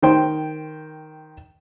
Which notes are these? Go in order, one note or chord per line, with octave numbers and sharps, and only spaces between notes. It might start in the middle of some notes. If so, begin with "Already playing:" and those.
D#3 C5 G5